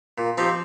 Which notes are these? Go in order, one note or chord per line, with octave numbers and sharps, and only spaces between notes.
A#2
F3 C4 D#4 G4